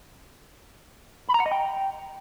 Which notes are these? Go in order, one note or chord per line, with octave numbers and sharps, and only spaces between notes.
B5
A#5
F#5
D#5
G5